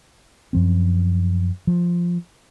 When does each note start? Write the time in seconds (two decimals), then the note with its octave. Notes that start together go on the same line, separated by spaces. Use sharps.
0.53 F#2 F3 C4
1.67 F3